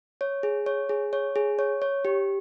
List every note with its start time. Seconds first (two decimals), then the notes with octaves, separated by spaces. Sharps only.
0.21 C#5
0.43 G#4
0.66 C#5
0.89 G#4
1.13 C#5
1.36 G#4
1.59 C#5
1.82 C#5
2.05 G4